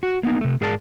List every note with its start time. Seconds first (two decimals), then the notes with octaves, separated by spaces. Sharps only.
0.03 F#4
0.23 A#3 B3 D#4
0.41 C3 A3
0.61 G#2 G#4 A#4 D5 A5